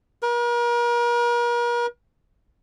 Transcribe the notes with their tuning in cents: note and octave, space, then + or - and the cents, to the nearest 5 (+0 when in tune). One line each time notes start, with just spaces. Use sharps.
A#4 +40